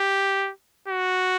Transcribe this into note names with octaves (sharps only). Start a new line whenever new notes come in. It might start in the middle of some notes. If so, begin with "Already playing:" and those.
Already playing: G4
F#4